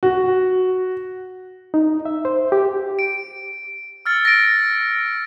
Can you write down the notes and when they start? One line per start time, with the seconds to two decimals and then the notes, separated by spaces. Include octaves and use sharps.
0.03 F#4
1.74 D#4
2.05 E5
2.25 C5
2.52 G4
2.99 D7
4.05 E6 F6 A6 C#7
4.25 A#6 D7